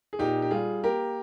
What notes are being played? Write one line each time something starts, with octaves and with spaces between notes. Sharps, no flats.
G#4
A#2 D#4 G4
G4
G3 F4 G#4
A#3 G4 A#4